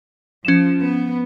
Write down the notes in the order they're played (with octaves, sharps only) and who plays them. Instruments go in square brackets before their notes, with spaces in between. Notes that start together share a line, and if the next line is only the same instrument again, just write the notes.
[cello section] F3 [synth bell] C#4 E7
[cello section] B3